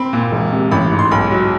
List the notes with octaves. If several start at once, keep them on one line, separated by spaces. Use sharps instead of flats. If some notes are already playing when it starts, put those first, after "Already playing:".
Already playing: C4 B5
A#2
E1
C3
A1 B5
G#2
C6
B1 B5
F#3